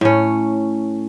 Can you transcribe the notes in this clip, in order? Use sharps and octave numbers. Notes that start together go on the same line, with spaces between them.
A2 C#4